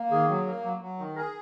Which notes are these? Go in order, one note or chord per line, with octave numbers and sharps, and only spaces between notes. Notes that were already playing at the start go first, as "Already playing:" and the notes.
Already playing: A#3
D#3 G#4
F#3
A#3
F#3
F#3
D#3
G#4 A#4